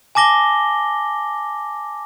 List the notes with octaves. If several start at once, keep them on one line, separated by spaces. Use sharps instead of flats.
G#5 A5 D6 A#6 G7